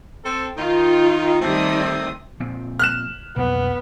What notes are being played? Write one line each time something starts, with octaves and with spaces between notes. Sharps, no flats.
C4 A4
D#3 D#4 F4
D#3 G3 A3 C4 D#6
A#2 F3 C4
F6 F#6 E7
B1 F2 A#3 B3